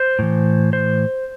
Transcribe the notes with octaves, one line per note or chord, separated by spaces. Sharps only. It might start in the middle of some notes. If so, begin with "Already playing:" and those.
Already playing: C5
A2 E3
C5